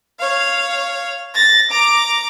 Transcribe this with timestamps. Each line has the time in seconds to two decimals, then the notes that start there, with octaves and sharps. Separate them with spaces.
0.19 C#5 F5
1.34 A6 A#6
1.70 A#5 D6